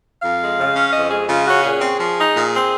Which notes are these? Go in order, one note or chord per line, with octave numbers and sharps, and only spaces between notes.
F2 F5
G#3
C#3
C#4
F2 D#5
G#3 G#4
C#3 F4
C#4 F#4
A#2 G#4
C4
F3
D#4
A#2
C4